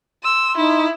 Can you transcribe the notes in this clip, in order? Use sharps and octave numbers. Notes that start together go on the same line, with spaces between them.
C6 E6
D#4 E4